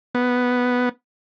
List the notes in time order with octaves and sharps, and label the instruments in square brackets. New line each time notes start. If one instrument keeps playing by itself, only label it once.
[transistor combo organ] B3